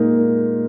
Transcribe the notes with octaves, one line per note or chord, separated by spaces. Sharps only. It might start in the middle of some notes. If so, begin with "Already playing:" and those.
Already playing: A#2 G#3 A#3 D#4